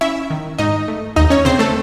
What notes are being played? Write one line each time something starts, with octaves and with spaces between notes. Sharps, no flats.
C#4 E4 E5
D#3
G#2 D#4 D#5
A3
D#2 D#4 D#5
C#4 C#5
C#3 C4 C5
A3 A4